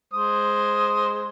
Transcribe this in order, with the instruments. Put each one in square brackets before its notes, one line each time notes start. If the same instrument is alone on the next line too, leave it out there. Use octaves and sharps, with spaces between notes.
[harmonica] G#3 C5 D#6